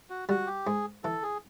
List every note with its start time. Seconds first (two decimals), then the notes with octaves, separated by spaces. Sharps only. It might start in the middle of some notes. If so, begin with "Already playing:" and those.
0.10 F#4
0.29 G3 F#4
0.47 G4
0.66 G#2 G#4
1.04 E3 A4
1.23 G#4